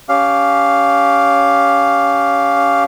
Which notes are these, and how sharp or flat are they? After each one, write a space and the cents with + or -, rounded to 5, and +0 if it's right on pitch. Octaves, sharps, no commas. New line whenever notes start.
C#4 +20 G4 +0 F5 +0